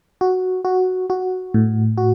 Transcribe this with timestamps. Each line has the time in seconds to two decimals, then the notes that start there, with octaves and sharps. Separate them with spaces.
0.21 F#4
0.65 F#4
1.10 F#4
1.54 A2
1.98 F#4